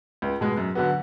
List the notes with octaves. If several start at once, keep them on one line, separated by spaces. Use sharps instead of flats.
C#2
B2 G#3
F#2
D3 F#3 B3